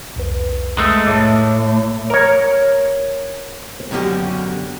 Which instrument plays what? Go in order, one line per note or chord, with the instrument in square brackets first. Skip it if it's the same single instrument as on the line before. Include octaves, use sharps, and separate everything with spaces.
[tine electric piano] C2 F2 B4
[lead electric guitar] G#3 A3
[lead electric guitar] A2 [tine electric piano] E5 A5 D6
[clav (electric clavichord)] A#4 C#5
[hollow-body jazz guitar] F#2 B2 D3 C#4 G4